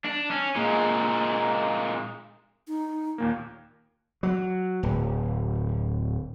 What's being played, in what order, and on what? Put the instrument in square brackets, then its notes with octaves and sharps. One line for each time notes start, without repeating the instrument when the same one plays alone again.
[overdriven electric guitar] D4
C#4
A#2 G#3
[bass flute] D#4
[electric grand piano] D#2 A#2 A#3
[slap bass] F#3
D1